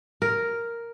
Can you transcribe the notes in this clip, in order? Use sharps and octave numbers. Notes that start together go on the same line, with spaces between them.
A#4